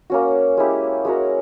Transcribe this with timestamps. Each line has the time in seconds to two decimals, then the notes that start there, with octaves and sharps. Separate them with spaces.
0.10 A#3 C#4 F#4
0.57 G#3 C#4 E4 G4
1.05 G#3 C#4 F#4 A#4